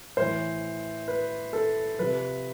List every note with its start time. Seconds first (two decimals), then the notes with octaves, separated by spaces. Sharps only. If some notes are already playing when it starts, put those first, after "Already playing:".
0.17 A2 E3 C5
1.08 B4
1.53 A4
1.99 C3 F3 B4